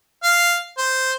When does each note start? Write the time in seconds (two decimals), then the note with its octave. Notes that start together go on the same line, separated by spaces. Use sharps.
0.23 F5
0.78 C5